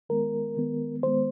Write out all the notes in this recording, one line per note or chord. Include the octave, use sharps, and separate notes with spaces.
D#3 G#3 B3 A#4
D#3 G#3 B3
D#3 G#3 B3 C5